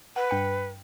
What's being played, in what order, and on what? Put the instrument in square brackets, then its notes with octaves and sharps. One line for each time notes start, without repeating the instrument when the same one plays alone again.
[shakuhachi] B4 [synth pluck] F#5
[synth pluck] G2 G5 C#7